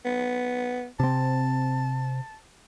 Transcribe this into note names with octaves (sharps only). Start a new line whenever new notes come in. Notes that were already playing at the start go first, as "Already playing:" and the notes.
B3
C3 C4 A5